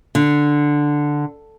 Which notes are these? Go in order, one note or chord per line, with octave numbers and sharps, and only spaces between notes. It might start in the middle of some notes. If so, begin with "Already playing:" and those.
D3